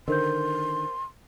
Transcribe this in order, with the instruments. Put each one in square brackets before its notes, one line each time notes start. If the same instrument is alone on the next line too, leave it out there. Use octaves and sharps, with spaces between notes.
[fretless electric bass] D3 D#3 [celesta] A#4 C5 G6 [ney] C6